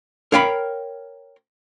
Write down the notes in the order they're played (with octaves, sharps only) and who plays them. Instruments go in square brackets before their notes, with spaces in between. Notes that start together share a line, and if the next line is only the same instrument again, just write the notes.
[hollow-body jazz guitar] A#4 C#5 F5 G5 A#5 B5